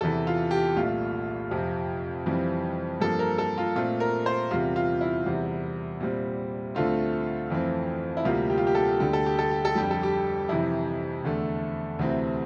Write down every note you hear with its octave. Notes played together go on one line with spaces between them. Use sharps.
E2 C3 E3 A4
F4
G4
C2 A#2 A3 F4
F2 C3 F3 C4
F2 E3 G3 C4
G2 F3 A#3 A4
A#4
A4
F4
A#2 A3 C4 F4
A#4
C5
E2 C3 G3 C4 F4
F4
E4
E2 C3 G3 C4
A#2 G3 C4
D2 D3 A3 C4 F4
F2 E3 A3 C4
E4
D2 C3 G3 A#3 F4
G4
F4
G4
A4
D2 D3 G3 G4
A4
G4
A4
G4
A4
F2 D3 G3 G4
A4
G4
F2 C3 E3 E4
E2 D3 A3
D2 C3 E3 A3 C4